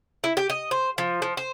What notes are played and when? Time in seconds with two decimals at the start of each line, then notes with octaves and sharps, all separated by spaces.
0.24 E4
0.37 G4
0.50 D#5
0.71 C5
0.98 F3
1.22 F3
1.37 C5